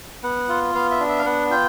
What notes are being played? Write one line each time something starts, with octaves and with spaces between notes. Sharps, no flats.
B3 F#5
F4
B3 F5
E5
D4
E5
F5
B3 F#5
F4 G5